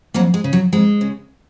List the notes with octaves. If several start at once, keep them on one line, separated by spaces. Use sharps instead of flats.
F2 F#3 A#3
G#3
C#3
F#3
F2 G#3
C#3